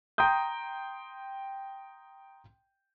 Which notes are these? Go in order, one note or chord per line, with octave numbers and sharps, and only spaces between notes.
G5 A#5 C6 D#6 G6